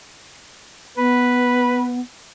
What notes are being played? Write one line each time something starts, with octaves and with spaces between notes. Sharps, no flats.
B3 B4